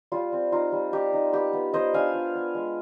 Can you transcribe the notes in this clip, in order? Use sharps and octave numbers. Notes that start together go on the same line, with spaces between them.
G3 F4
C4
D#4 F4
G3
D#4 G4
D#4
B3 G4
B3
B3 C5 D#5
D4 F5 G#5
F4
B3
G#3